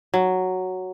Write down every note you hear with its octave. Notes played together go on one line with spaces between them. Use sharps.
F#3